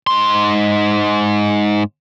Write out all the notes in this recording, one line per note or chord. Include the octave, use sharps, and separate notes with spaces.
G#2 C6